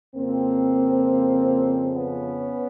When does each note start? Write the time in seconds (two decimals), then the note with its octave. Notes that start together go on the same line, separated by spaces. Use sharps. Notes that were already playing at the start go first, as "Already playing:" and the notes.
0.15 F2 C#3 F3 A#3 C4
1.96 B3 C#4